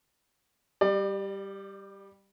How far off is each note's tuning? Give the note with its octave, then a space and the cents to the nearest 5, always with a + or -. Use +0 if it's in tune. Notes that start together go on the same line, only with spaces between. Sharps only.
G3 +0 D5 +35